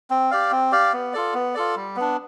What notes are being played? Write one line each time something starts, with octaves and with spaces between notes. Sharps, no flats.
C4
G4 D5 F5
C4
G4 D5 F5
B3
F4 A4 D5
B3
F4 A4 D5
G3
B3 D4